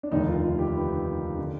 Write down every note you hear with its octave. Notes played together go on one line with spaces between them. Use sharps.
D4
F1 D#2 D3 D#4
F4
F4
G4
B4
D3